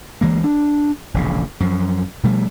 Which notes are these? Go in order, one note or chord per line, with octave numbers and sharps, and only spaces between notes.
D2 E3 G#3 A#3
D4
E1 A#1 C#3
F#2 F3
B2 F3 G3 A3